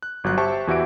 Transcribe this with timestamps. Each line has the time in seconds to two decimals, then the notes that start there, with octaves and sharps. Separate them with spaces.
0.03 F#6
0.24 G1 F#3 F#6
0.37 G4 C5 E5 G5 A5 C#6
0.67 E2 E3 F#4 G4 E5 D7